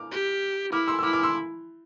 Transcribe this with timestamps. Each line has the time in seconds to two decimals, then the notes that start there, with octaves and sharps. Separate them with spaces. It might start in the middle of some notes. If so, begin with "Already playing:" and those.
Already playing: D6 F6
0.11 G4
0.72 E4 D6 F6
0.88 C6 E6
0.99 E6
1.03 E4 D6 F6
1.13 D6 F6
1.23 C6 E6